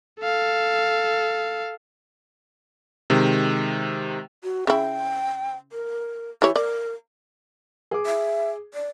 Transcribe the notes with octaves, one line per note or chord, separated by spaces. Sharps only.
A4 F5
C3 D#3 G#3
F#4
C#3 E4 G5
A#4
E3 E4 G4 C#5
A#4 D5
G#4 D6
E5
D5